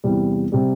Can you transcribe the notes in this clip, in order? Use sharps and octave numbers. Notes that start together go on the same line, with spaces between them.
E2 C3 G3
C3 G3